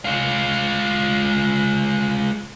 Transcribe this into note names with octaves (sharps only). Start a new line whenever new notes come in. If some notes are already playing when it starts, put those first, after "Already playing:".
G#3 F4